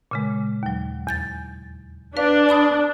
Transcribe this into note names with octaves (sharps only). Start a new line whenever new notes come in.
A#2 C#3 G#3
D#2 F#3
E2 G6 A6
D4 B4 F5
D5 B5 D#6